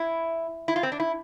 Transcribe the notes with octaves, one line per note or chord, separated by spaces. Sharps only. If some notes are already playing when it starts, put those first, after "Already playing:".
Already playing: E4
E4
F4
C4
D4
E4